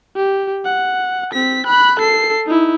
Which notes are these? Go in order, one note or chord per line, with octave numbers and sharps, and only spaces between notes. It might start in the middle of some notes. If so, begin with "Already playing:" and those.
G4
F#5
C4 B6
B5 F#6
A4 C7
D#4 E4